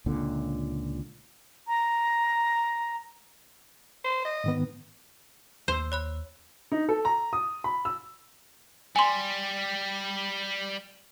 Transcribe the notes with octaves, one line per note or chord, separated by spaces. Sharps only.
C#2 A#2 D3
A#5
C5
D#5
G#2 D#3 B3
D#2 C5 E6
C#5 B5 F#6
D#4
A4
A#5
D#6
B5
E6
G3 G#5 C6